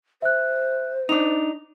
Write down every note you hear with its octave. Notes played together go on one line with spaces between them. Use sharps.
C5 E5 F#6
D4 D#4 F7